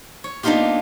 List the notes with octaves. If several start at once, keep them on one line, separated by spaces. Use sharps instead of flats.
C#5
A#3 B3 D4 D#4 F4 G4